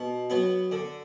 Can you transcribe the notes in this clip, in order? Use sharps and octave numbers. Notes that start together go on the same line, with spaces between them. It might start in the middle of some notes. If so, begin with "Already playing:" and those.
Already playing: B2
F#3 B3
D3